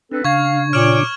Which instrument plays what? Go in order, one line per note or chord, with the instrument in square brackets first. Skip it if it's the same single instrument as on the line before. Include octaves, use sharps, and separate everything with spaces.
[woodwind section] C4 A4 B4 [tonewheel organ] D4
[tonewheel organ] C#3 D4 [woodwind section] F5 [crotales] C#6 G#6
[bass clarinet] A#2 [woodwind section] C#5 D6 [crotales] F6 E7 F#7